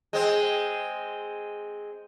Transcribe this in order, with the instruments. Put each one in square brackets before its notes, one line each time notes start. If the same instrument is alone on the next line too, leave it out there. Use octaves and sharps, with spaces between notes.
[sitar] G#3 C4